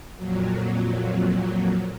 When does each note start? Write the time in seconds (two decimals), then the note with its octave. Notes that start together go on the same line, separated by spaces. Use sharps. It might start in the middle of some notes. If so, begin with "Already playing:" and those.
0.17 F2 A#2 F#3